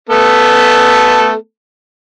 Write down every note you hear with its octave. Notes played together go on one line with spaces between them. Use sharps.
A3 B3 A4